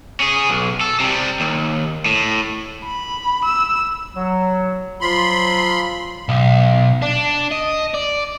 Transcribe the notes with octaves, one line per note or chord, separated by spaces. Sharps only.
C#4 G#4
B1
A4
C3 G3
D#2
A2
B5
E6
F#3
F3 F#3 F4 B5 C6
B1
D4
D#5
D5